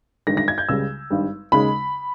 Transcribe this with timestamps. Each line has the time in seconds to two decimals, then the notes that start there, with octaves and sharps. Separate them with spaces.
0.27 G1 G2 D#3 G#3 A#6
0.37 A#6
0.48 G#6
0.58 G6
0.69 C#2 C#3 G3 E6
1.10 G#1 G2 G3
1.52 D#2 C#3 G#3 B5